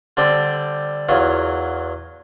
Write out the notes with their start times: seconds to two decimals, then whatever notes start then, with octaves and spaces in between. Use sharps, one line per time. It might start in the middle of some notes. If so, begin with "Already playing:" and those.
0.17 D3 G3 C4 D5 G5
1.09 E2 F#3 F4